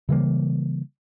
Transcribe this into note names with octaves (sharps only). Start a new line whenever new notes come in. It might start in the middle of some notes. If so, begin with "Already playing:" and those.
C#3 E3 G3 A#3